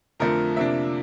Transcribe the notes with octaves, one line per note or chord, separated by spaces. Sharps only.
F2 D3 F3 A3 A#4
C3 F3 A#3 D4 E5